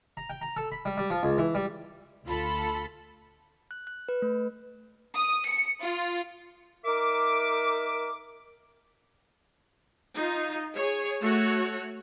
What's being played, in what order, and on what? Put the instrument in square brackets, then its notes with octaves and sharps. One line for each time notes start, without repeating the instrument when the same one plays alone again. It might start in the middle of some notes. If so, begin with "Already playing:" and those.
[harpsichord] A#5
G5
A#5
A4
B5
G3
G3
F3
C#2
E3
G3
[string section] D2 F4 A4 B5
[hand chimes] F#6
F#6
B4
A3
[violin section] D#6
C#7
F4
[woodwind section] D#4 E5 D6 [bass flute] A#4
[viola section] D#4 F4
G#4 C#5
A3 F#4 C#5